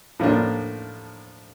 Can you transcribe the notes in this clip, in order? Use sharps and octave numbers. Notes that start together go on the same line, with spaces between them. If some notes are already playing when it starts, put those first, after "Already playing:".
A2 F3 A#3 D4